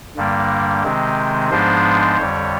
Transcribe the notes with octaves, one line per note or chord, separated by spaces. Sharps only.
G2 D3 G3 A#3
C3 D#3 G#3 C4
G#2 F3 G#3 B3 D4 C5
F2 D3 G3 C#5